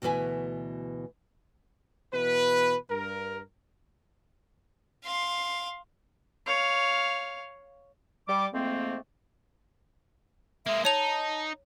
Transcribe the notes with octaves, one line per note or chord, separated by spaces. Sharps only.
D2 B2 E3 B4 E5 G#5
B2 E3 B4
G2 A#4
F5 C6
C#5 F5
G3 D6
F2 G#2 A3 A#3 C4
G#3 A#3 E5
D#4 C#5 A5 F7